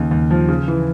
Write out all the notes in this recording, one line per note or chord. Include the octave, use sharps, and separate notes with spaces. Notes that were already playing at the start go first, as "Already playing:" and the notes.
Already playing: D#2 C#3
D#2
F3
C#3
E3